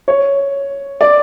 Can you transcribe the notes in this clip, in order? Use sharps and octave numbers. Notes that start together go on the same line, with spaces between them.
C#5
D5